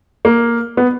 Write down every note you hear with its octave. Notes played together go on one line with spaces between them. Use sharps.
A#3
B3